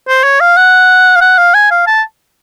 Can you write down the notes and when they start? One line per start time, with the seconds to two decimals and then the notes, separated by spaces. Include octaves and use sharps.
0.08 C5
0.24 C#5
0.41 F5
0.57 F#5
1.16 F5
1.21 F#5
1.38 F5
1.54 G#5
1.71 F5
1.87 A5